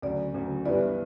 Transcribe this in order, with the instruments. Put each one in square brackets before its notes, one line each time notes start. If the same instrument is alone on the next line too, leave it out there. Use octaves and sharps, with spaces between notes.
[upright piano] D2 C#3 F#3 [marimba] D5
[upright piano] D2 C#3 F#3
[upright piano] G2 E3 G3 B3 E4 [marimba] D5